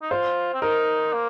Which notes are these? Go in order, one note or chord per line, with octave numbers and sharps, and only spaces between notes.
D#4
F4 C5
C4
D#4 A#4
A#3